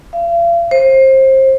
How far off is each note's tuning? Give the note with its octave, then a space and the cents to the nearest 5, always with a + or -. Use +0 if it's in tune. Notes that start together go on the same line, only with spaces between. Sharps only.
F5 -40
C5 +25